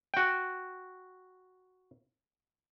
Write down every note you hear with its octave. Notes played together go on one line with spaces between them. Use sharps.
F#4 G5